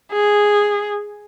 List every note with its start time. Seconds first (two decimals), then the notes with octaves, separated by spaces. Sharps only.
0.13 G#4